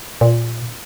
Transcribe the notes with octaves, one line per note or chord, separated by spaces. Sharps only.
A#2